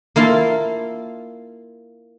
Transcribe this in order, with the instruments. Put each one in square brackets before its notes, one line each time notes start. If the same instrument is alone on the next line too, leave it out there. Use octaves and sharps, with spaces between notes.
[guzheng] A#3 E4 F4 F5 A5